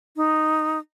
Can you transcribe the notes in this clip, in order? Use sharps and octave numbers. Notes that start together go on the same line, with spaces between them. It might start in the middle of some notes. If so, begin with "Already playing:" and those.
D#4